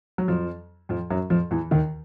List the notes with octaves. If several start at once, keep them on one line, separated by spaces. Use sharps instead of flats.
F#3
F2 F3
F2 F3
F#2 F#3
F2 F3
E2 E3
D#2 D#3